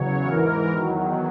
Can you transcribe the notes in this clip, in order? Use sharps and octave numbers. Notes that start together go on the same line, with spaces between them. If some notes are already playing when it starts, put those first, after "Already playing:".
Already playing: E2 C#3 F#3 C#5
G#2 E3 A#4
E2 D#3 F#3